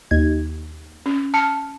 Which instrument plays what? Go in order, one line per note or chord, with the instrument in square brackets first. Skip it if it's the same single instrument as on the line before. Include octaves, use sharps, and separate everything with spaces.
[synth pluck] D#2 G#6
[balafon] C#4
[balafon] A5 [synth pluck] F6 C#7